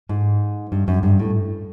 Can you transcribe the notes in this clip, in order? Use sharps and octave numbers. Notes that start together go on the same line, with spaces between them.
G#2
G2
F#2
G2
A2